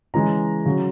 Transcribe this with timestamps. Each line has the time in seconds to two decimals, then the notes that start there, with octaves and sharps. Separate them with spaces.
0.14 C#3 E3 G#3 A#5
0.66 C#3 F#3